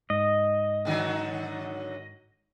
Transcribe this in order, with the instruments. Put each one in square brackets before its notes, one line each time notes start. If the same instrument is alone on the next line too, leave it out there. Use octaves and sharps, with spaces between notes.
[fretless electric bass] G#2 [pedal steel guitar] D#5
[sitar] D3 D#3 F#3